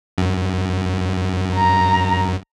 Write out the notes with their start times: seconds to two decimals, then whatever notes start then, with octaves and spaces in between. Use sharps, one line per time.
0.18 F#2
1.54 A#5